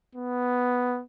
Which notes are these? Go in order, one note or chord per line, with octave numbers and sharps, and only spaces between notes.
B3